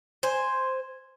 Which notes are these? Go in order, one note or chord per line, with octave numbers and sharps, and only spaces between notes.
C5 G#5